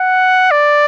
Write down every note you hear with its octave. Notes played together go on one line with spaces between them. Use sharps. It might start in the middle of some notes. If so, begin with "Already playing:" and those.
Already playing: F#5
D5